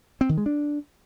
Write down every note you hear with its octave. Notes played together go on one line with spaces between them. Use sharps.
C4
D#3
G#3
D4